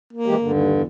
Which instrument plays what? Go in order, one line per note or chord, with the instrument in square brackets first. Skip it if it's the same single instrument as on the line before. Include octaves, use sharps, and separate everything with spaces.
[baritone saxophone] A#3
[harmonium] E3 G#3 G4
G2 D3
[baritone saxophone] D#2
E2